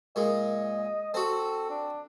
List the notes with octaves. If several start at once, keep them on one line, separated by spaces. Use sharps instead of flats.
A#2 G#3 D#5
C4 F#4 A4
D4